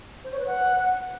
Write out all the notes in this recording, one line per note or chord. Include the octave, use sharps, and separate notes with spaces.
C5
C#5
B4
F#5